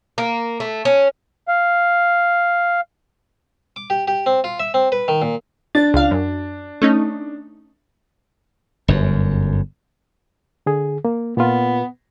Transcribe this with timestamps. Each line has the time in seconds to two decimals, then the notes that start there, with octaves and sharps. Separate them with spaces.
0.18 A#3
0.60 A3
0.85 C#4
1.48 F5
3.76 D6
3.90 G4
4.08 G4
4.26 C4
4.44 F4
4.60 E5
4.74 C4
4.92 B4
5.08 D#3
5.22 A#2
5.75 D4 A6
5.94 C#2 F5
6.11 F#2
6.82 A3 C#4 D#4
8.88 G1 F#2
10.66 D3 G#4
11.05 A#3
11.37 A#2 B3 F4